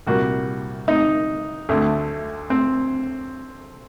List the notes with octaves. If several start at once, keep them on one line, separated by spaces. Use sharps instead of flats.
C2 A#2 G3 A#3 F#4
D#4
D2 D3 A3
C4